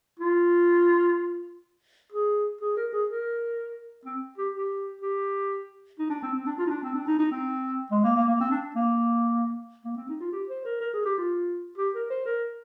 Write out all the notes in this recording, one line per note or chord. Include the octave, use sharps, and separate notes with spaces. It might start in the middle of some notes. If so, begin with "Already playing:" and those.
F4
G#4
G#4
A#4
G#4
A#4
C4
G4
G4
G4
D#4
D4
C4
C4
D4
F4
D#4
D4
C4
D4
D#4
D#4
C4
G#3
A#3
A#3
A#3
C4
D4
A#3
A#3
C4
D#4
F4
G4
C5
A#4
A#4
G#4
G4
F4
G4
A#4
C5
A#4